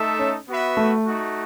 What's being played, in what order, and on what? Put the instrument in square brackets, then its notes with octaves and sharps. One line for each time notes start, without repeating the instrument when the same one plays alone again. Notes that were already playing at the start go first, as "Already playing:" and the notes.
Already playing: [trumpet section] A3 D#4 A4 E5
[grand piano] C#4
[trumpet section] B3 F#4 B4 E5
[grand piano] A3
[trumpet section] A3 D#4 F#4